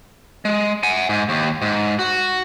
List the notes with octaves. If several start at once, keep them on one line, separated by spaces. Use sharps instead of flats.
G#3
F#5 G#5
G#2
D#2
G#2
F#4